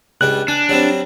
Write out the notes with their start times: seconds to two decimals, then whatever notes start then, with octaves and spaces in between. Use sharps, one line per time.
0.21 C#2 G3 D4 F#6
0.48 D4 G#5
0.69 F#3 G3 C4